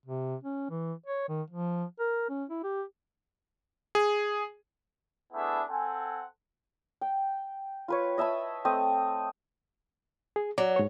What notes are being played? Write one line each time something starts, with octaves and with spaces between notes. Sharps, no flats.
C3
C#4
E3
C#5
D#3
F3
A#4
C#4
E4
G4
G#4
A3 B3 D4 E4 G#4 E5
C4 A4 F#5 G#5
G5
F4 B4 C#5
D#5 E5 A5 B5
A3 C4 D#5
G#4
F#3 D5
G#2 C#5